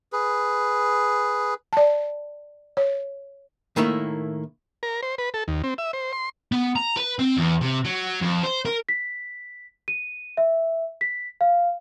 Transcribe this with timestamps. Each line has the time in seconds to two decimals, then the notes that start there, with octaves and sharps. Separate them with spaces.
0.13 G#4 B4
1.73 D5 A5
2.77 C#5
3.76 A2 D#3 A3 A#3 E4
4.83 A#4
5.03 C5
5.18 B4
5.34 A4
5.48 D#2
5.64 C4
5.78 E5
5.93 C5
6.13 C6
6.52 B3
6.76 A#5
6.97 B4
7.19 C4
7.37 E2
7.61 C3
7.85 F#3
8.21 F2
8.43 C5
8.65 A#4
8.89 B6
9.88 D#7
10.37 E5
11.01 B6
11.41 F5